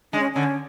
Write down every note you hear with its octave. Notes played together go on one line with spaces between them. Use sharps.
G#3 D4
C#4
D3 C#4